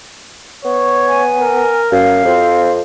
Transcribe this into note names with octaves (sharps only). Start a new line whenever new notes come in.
B3 C#5
G#5
A#4
F#2 F5
F2 C4